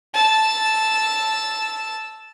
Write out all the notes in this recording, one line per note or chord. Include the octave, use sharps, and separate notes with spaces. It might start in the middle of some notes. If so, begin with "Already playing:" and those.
A5 E6